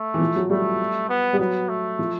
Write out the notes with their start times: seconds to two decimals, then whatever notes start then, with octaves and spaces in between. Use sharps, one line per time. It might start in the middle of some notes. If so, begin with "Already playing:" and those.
Already playing: A3
0.14 E3
0.21 F3
0.36 F#3
0.50 G3 A3
1.09 B3
1.33 G3
1.39 F#3 B3
1.69 A3
1.99 F3